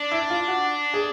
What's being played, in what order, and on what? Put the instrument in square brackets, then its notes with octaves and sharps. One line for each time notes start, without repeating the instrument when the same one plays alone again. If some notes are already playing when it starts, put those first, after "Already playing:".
Already playing: [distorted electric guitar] D4
[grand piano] E4
F4
F#4
G#4